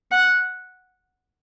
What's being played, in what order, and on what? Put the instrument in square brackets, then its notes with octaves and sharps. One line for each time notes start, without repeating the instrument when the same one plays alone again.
[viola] F#5